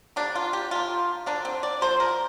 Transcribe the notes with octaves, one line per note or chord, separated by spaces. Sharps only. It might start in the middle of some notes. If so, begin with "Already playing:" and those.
D3 G3 A#3 D4
F4
G4
D3 A#3 F4
D3 A#3 D4
C4
D5
D3 F3 A#3 C5
A#4